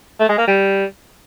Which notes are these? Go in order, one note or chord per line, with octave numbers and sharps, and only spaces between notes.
A3
G#3
A#3
G3